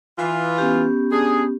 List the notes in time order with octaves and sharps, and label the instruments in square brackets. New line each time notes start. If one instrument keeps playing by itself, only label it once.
[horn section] E3 F4
[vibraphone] B3 C#4 G4
[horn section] D4 G#4